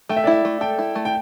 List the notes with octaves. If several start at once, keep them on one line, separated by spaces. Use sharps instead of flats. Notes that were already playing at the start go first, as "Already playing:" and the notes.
A3 G5
E5
D5
E4 E5
A3
A4 G5
E4
A3
G5